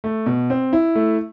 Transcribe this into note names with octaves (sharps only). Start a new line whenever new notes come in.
A3
B2
C4
E4
A3